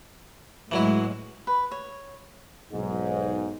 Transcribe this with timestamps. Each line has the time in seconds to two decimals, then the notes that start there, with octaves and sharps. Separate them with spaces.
0.71 A2 E3 F#3 G#3 E4
1.47 B4
1.71 C#5
2.73 B1 G#2